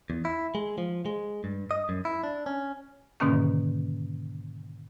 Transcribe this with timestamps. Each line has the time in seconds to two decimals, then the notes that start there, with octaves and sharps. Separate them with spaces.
0.10 E2
0.25 E4
0.55 G#3
0.78 F3
1.06 G#3
1.44 G2
1.71 D#5
1.89 F#2
2.05 E4
2.24 D4
2.46 C#4
3.20 G#2 B2 D3 D#3 A#3 C#4